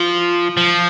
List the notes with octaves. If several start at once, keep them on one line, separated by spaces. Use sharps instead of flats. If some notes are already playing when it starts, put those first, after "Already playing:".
Already playing: F3
F3